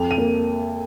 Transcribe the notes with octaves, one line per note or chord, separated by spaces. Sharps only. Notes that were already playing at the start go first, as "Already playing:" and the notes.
Already playing: F2 F7
D#7
A#3